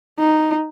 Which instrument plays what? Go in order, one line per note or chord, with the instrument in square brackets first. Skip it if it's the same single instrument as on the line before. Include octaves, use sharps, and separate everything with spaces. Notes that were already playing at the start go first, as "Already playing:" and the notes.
[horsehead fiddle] D#4